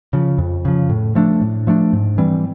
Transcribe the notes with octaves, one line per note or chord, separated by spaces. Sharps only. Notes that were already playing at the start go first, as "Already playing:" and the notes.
C#3 F3
F2
C#3 F3
A2
F3 A3 D4
A2
F3 A3 D4
G#2
E3 G3 C4